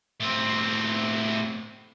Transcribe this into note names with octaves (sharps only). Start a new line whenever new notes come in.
A2 C4